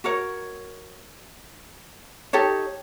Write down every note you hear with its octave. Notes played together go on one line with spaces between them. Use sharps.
F#4 A#4 C#5
D#4 G4 A4 C#5